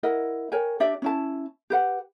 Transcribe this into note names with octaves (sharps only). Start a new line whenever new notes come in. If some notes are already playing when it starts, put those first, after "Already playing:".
E4 A#4 D#5 F#5
A#4 C#5 G5 G#5
D4 G4 D5 E5
C#4 E4 A5
G4 B4 F#5